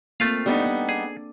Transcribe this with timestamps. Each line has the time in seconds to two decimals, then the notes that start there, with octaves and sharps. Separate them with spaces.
0.20 A3 A#3 C4 F4 F5
0.46 G3 B3 D4 D#4 A4
0.89 G#4 D5